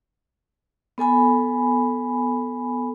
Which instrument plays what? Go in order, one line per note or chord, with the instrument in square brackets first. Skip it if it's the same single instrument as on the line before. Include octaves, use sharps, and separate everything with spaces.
[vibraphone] B3 A4 G#5 B5